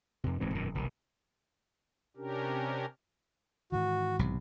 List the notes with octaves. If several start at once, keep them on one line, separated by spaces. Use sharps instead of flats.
F2 C3
D1 G#2 E3 C4
E1 F#2 A#2 D#3
F1 B1 C3 D#3
C3 C#4 D4 G4 A#4
G#2 D#3 E3 F#4
B1 C3